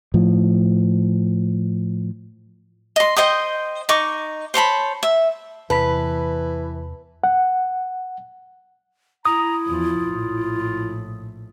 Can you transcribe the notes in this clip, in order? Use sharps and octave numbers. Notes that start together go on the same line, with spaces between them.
A2 F3
D#5 C6
C5 D#5 G5 D#6
D#4 D#5 C#6 D6
C5 C#5 A5 B5
E5
E2 C3 E3 B4 A5 B5 B6
F#5
E4 A#5 D#6
E2 F3 F4
A#1 A2